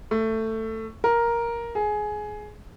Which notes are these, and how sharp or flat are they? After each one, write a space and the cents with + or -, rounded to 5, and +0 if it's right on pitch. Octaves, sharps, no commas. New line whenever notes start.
A3 +15
A#4 +5
G#4 +15